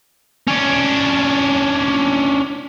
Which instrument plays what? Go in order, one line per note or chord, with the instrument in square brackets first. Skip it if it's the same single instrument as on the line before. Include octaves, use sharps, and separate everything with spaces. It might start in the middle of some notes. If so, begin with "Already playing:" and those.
[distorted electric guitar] C#4 D4